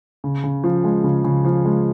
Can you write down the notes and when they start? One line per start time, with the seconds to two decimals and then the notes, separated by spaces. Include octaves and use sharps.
0.24 C#3
0.44 C#3
0.64 F3
0.84 G#3
1.04 C#3
1.24 C#3
1.45 F3
1.65 G#3